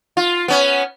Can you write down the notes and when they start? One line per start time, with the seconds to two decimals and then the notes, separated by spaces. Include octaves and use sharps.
0.17 F4
0.48 B3 C#4